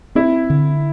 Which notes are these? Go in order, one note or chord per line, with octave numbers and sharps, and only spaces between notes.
C4 E4
D3